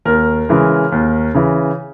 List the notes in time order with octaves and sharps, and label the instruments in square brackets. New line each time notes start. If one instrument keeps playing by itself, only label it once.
[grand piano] D#2 A#4
C#3 E3 G#3
D#2
C#3 E3